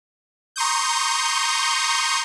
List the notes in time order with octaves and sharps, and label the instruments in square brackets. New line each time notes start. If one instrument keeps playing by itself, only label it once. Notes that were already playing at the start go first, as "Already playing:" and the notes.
[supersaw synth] A#5 C6 C#6 D#6 G6